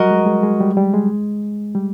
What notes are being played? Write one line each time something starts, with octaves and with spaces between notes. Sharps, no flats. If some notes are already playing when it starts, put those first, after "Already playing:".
Already playing: F#3 G3 F#4 A#4 D#5
G#3
G#3
G#3
G3
G3
G#3
G3